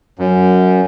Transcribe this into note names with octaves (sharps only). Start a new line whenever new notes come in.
F#2